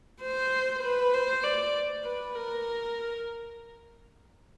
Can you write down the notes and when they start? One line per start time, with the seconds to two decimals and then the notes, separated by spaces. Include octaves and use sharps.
0.21 C5
0.83 B4
1.14 C5
1.43 D5
2.05 B4
2.35 A#4